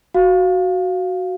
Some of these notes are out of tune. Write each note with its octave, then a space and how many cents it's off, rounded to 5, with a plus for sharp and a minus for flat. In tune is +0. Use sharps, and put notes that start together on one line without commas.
F#4 +0 F5 +0